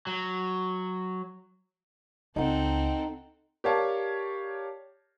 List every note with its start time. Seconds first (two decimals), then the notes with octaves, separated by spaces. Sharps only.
0.07 F#3
2.36 C#2 C4 D#4 A4 F#5
3.64 G4 A#4 C#5 D5 F5 A5